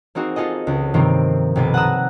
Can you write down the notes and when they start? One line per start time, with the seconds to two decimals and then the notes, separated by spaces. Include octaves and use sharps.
0.15 A#3 C4 D#4 F#4 G#4
0.36 F4 G#4 A4 D#5
0.67 C#2
0.94 G2 C3 D#3 F3 A#3 C4
1.56 B1 C3 B3 A6
1.74 F#5 A5 A#5 D#6 E6 F#6